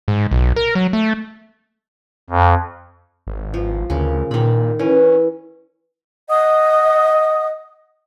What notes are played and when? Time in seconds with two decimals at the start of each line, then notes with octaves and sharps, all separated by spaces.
0.08 G#2
0.31 B1
0.56 A#4
0.75 F#3
0.93 A3
2.30 F2
3.27 G#1
3.54 F3
3.90 D2 C#3 A#4
4.31 A#2 D#3 B5
4.79 E3 C#4
6.29 D#5 F#5 D#6